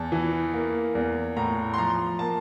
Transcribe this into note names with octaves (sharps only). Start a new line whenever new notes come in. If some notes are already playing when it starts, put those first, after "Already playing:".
Already playing: E2 A5
E3
A#3
E2
A2 A#5
C6
F3 A#5
A#3 A5